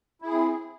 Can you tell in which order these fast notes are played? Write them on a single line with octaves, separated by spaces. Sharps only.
E4 G#4 C4